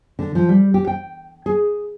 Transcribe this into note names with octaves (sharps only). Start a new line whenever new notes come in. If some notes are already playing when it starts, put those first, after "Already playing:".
D3
F3
G3
G4
G5
G#4